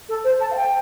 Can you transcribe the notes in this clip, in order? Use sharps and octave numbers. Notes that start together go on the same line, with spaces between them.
A4
C5
A5
F5
G5